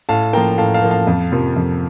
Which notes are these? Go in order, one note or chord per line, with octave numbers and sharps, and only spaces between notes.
A2 F5 A5
F3 A#3 G5 A#5
A2 F5 A5
F5 A5
F3 A#3
F5 A5
F2
C3 F3 A#3
F2